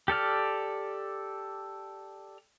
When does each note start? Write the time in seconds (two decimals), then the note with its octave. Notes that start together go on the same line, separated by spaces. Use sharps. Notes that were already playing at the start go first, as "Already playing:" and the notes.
0.08 G4 A4 D5 F6